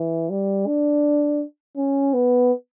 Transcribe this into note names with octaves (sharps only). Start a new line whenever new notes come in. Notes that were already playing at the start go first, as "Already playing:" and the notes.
Already playing: E3
G3
D4
C#4
B3